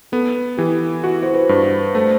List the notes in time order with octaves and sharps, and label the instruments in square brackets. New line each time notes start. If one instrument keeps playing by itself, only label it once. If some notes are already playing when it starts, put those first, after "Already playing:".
[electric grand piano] B3 [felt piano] A4
[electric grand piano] E3 [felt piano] G4
[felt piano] E4 [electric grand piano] F#4
[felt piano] C5
B4
[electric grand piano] G2
[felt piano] B4
[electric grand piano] A3 [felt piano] C5